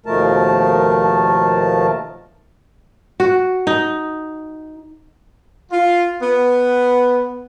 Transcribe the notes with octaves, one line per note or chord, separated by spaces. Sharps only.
D#2 B2 F3 A3 A#4 A5
F#4
D#4
F4
B3